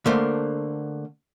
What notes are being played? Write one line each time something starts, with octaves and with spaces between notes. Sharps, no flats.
D3 A3 A#3 C5